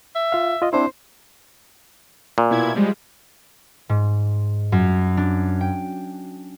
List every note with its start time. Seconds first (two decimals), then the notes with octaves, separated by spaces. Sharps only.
0.15 E5
0.32 F4 F5
0.62 F4 D#5
0.73 C4 D4 E4 C5
2.38 A#2
2.50 B2 E4 G#6
2.75 F3 G3 G#3
3.89 G#2
4.72 F#2
5.17 D4
5.61 G5